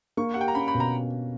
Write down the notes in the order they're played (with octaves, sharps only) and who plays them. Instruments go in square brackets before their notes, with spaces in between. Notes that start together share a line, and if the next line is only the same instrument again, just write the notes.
[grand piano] A#3 [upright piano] C#6
[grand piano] G4 [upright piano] F#5
[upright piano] G5
A#5
[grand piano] C#4 [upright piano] B5
[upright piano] B5
[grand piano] B2
[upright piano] A#5